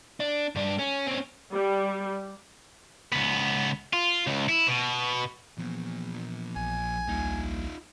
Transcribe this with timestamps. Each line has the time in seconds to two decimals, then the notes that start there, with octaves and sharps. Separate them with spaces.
0.20 D4
0.56 G2 D4
0.79 C#4
1.07 C4 C#4
1.52 G3
3.12 C#2 B3
3.93 F4
4.27 C#2
4.49 E4
4.68 B2
5.58 A#2 E3 F3 B3
6.56 A#1 G#5
7.08 D2 G3 A#3 D#4 F4